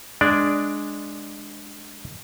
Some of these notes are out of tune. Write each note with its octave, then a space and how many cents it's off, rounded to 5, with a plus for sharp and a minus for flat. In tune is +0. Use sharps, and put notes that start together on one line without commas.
G#3 +0 D4 +0 D5 +0